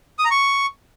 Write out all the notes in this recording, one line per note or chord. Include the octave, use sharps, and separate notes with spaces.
D#6
A#5
C#6